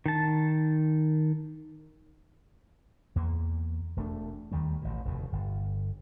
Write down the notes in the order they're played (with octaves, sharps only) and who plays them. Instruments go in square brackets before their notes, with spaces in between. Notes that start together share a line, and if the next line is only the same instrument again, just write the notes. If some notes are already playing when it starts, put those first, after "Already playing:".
[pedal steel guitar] D#3 A5
[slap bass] E2 A#3
E1 A3 D4
D#2 D#3 G3 A3
A1 B2
F1 D#2 B2
G1